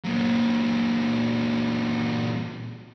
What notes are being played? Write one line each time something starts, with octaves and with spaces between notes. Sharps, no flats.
A#2 F#3